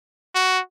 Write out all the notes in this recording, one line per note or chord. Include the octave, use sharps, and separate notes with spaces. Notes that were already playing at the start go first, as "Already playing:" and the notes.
F#4